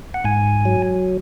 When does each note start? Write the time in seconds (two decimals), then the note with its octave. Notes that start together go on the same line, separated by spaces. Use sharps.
0.14 F#5
0.24 G#2 G#5
0.65 F#3